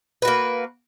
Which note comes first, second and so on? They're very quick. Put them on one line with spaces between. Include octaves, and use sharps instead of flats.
B4 F#4 A#3